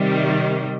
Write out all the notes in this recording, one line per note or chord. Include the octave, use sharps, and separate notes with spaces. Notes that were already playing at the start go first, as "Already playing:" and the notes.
Already playing: C3 D#3 G3